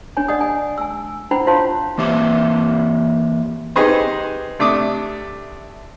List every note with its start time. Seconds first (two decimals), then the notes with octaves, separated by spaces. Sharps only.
0.17 D4 C#5 G#5
0.28 D5 D#5 F#5 D#6
0.41 G#5
0.78 G#5 E6
1.31 D4 E4 C5 F#5 G5 B5
1.47 F4 C5 C#5 F5 A5 C6
1.98 E3 A#3 G4 E5
3.76 D#4 G4 G#4 B4 C5 D#5
4.59 C3 A3 D4 D6 D#6